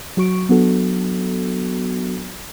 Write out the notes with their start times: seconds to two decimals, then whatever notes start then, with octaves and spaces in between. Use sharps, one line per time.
0.17 F#3 F#4 C#6 D7
0.49 F#3 B3 D4 F#4 A4